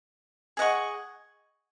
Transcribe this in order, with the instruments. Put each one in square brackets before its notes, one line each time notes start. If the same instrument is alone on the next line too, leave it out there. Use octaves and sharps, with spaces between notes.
[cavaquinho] G#4 D#5 F#5 C#6